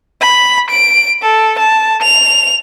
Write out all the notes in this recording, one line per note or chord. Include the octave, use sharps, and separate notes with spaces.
B5
D7
A4
A5
F7